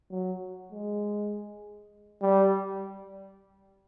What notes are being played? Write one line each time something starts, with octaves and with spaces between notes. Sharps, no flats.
F#3
G#3
G3